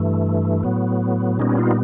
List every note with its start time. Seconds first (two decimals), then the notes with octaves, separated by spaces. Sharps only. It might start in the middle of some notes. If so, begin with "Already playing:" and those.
Already playing: G2 E3 A3
0.63 A2 F#3 B3
1.39 A#2 G3 B3 C#4 D#4
1.58 D#4 F4